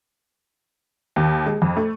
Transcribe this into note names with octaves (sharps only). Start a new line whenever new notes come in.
D#2
G#3
F2
A3